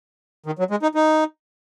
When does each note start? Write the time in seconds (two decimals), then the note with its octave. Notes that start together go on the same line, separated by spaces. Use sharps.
0.46 D#3
0.59 F#3
0.71 G#3
0.83 D#4
0.95 D#4